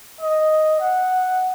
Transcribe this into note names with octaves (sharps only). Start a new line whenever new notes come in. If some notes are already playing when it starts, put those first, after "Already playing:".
D#5
F#5